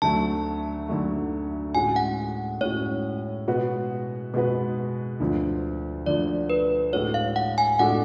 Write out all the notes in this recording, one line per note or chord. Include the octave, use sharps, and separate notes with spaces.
D2 D3 F#3 A3 A5
D2 D3 F#3 A3
A2 G#3 C#4 F#4 G#5
F#5
A2 G#3 C#4 F#4 C#5
B2 G#3 B3 F#4 B4
B2 G#3 B3 F#4 B4
D2 D3 F3
D2 D3 F3 D5
B4
A2 G#3 D4 F#4 A4 C#5
F5
F#5
G#5
A2 G#3 D4 F#4 A4 F#5